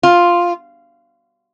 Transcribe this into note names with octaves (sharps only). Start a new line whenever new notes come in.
F4